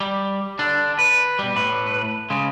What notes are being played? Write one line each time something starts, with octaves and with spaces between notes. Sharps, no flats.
G3
D3 D4
B4
B2 G3
A2 B4
C#3 G#3